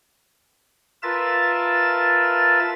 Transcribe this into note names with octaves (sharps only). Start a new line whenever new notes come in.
F4 A#4 B4 E5 A5 A6